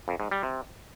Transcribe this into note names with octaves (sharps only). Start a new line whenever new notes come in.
F2
G#2
G3
C3